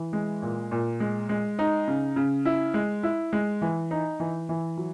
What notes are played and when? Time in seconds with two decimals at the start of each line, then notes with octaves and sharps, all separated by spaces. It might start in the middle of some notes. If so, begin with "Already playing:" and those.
Already playing: E3
0.13 G#3
0.42 A#2
0.71 A#2
1.00 G#3
1.29 G#3
1.59 D#4
1.88 C#3
2.16 C#3
2.45 E4
2.74 G#3
3.03 E4
3.33 G#3
3.62 E3
3.91 D#4
4.20 E3
4.49 E3
4.77 F#3